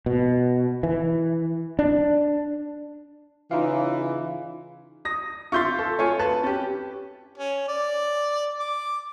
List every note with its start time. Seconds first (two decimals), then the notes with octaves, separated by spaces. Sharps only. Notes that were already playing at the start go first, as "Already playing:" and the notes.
0.06 B2
0.83 E3
1.79 D4
3.51 C#3 E3 D#4 F4 F5
5.05 D#6 A#6
5.52 F4 E5 C6 C#6 G6 A6
5.79 A4
5.99 A3 F4 C#5 G#5
6.19 B4 A5
6.43 C#4 G4
7.38 C#4
7.68 D5
8.59 D6